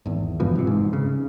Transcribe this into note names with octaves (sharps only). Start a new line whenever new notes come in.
G#1 E2
G2 B2 E3 F3
G#1 C3
G#2
C#3